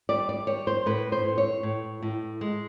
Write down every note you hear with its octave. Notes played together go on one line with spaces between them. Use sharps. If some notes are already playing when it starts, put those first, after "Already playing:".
G3 D5
D5
G3 C#5
C5
A2 B4
C5
A2
C#5
A2
A2
G#3